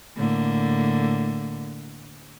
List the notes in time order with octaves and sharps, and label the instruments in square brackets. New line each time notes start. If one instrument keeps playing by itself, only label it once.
[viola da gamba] A2 D3 A#3